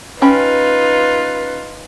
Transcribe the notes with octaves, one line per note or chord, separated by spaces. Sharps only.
C#4 D#4 F4 B4 G5 B5